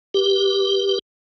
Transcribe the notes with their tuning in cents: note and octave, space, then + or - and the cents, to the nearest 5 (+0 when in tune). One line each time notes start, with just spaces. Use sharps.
G4 +0 B4 -35